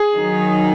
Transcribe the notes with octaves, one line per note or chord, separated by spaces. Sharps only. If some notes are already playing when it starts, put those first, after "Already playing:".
Already playing: G#4
D#3 F#3 D#4